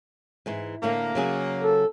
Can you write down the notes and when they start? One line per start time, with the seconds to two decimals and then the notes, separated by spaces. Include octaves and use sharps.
0.46 G#2 E3 G#3
0.83 A2 D3 A3 A#3
1.15 C#3 F#3 G#4
1.63 A4